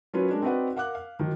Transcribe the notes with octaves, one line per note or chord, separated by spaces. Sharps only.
F#3 C#4 F4 A#4 B4 C#5
G#3 D4 A#4
C4 D#4 F#4 B4 D5 F#5
A#4 F5 F#5 D6 F#6
F5
D#3 F3 F#3